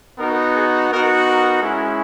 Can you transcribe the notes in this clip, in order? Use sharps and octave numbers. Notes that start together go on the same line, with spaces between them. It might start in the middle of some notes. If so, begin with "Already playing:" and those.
B3 D#4 F#4 A#4
G#4
B3 D#4 F#4 A#4
A#4
G#3 C#4 E4